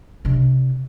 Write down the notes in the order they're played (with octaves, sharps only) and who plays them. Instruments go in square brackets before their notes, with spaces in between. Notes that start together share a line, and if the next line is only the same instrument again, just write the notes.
[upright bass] C3 D4